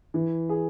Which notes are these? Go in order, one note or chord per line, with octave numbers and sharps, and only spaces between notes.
E3
G#4